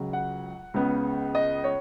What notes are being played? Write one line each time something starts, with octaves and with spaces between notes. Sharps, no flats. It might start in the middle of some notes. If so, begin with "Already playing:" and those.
Already playing: C#2 C#3 F#3
F#5
C#2 C#3 B3
D#5
C#5